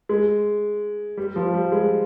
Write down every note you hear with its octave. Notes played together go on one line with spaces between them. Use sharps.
G#3
G3
F3
G3
G#3